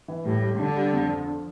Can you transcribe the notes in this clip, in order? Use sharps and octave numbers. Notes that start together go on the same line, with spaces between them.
E3
A2 G3
G3
D3 D4
G3
F2
F3
D3